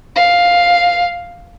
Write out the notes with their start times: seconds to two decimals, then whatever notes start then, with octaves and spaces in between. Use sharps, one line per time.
0.16 F5